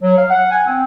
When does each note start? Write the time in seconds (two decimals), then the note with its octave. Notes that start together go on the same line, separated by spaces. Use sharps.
0.01 F#3
0.17 F5
0.30 F#5
0.51 G#5
0.66 C4